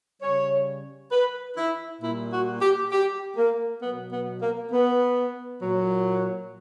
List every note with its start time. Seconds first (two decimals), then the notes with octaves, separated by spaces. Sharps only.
0.21 C#3 G3 C#5
1.12 B4
1.57 E4
2.01 A#2 G3 E4
2.32 F#4
2.61 G4
2.92 G4
3.37 A#3
3.82 B2 F#3 B3
4.12 B3
4.42 A#3
4.72 B3
5.62 A#2 F#3